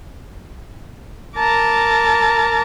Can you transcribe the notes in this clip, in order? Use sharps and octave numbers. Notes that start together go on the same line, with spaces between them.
A#4 A5 A#5 D6